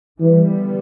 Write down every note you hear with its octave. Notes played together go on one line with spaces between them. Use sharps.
D3 E3 G3 B3